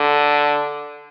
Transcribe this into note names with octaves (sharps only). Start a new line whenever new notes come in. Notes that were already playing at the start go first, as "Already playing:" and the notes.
Already playing: D3